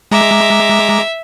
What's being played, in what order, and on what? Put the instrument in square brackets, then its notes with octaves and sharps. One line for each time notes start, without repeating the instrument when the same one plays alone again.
[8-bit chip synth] G#3 A#5 D6 [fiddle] E5